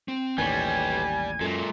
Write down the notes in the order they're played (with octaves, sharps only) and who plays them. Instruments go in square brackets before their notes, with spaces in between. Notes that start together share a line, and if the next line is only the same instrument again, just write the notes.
[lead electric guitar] C4
[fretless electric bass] A1 D#2 A2 [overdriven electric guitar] G3 [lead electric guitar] B4 C#5 [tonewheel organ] G#5
[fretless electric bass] F#2 [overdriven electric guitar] A#2 [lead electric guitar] G#3 A4